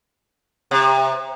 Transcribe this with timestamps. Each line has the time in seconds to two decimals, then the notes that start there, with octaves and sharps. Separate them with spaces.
0.71 C3